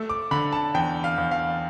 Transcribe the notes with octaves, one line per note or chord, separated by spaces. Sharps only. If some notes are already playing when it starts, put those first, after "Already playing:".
Already playing: A3 E6
D6
D3 B5
A5
E2 G5
F5
E2
F5